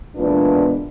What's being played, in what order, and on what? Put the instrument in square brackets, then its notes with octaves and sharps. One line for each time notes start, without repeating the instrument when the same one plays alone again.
[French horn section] E2 A#2 G#3 B3 D4